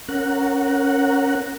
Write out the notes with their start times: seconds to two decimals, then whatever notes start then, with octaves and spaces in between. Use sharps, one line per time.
0.09 C#4 A#4 F#5